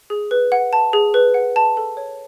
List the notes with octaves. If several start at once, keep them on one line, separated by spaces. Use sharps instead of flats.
G#4
B4
F#5
A5
G#4
B4
F#5
A5
A4
C#5